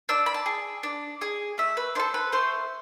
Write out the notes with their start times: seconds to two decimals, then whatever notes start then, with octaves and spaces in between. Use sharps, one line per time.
0.09 D4 E6
0.26 B5
0.34 A5
0.46 G#4
0.83 D4
1.21 G#4
1.58 A3 E5
1.77 B4
1.95 D4 A4 C5
2.14 B4
2.32 A3 C5